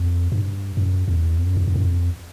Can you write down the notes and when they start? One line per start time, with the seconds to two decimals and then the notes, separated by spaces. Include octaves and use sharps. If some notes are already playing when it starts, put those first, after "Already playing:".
Already playing: F2
0.32 G2
0.77 F#2
1.08 E2
1.37 F2
1.47 F#2
1.57 F2
1.67 F2
1.76 F#2
1.84 F2